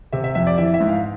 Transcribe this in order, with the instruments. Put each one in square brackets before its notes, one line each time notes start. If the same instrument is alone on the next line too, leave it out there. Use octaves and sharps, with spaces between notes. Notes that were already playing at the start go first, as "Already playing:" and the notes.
[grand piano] C3 E5
E5
F2 E5
D5
E3 E5
E5
G#2
F5